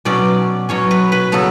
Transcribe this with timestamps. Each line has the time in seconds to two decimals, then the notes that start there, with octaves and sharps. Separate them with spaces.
0.05 B2 F#3 C#4 D5
0.69 B2 F#3 C#4 C#5
0.91 B4
1.12 B4
1.32 C#3 F#3 B3 A4